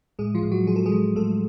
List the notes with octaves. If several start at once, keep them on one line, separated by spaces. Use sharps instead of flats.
A2 G#3 G#4
F3 F4
A2
F#3 F#4
F3 G#4
A4
G#3 G#4
F3
A2 A3 A4